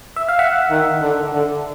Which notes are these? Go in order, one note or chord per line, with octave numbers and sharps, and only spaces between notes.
E5
F5
E5 F#5
D#3
D3
D3